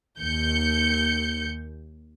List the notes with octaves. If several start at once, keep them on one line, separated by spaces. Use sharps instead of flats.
D#2 G6 C#7